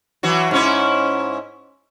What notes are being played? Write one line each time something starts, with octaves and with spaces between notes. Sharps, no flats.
E3 F#3 F#4
G#2 C#4 E4